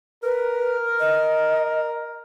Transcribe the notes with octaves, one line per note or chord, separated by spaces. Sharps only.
A#4 B4
D#5